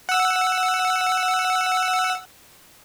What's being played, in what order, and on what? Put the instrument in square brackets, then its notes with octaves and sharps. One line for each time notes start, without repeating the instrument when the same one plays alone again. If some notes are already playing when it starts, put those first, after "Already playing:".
[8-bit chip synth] F#5 E6